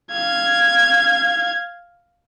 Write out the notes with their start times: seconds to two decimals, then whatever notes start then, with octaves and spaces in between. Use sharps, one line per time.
0.11 F5 G#6